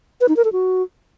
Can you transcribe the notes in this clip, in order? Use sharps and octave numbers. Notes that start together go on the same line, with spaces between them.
B4
D#4
A#4
A4
F#4